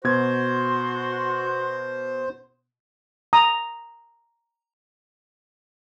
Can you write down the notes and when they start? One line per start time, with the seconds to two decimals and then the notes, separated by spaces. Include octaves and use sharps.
0.05 B2 F#4 C5 C6 G#6
3.33 A#5 D#6